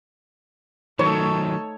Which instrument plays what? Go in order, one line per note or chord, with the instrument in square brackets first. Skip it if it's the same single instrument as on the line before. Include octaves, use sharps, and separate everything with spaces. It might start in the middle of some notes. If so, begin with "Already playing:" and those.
[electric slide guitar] D#3 F#3 [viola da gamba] A3 D#4 A4 [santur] C#5